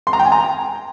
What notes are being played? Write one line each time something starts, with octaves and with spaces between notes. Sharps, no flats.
C6
A#5
G5
G#5
A#5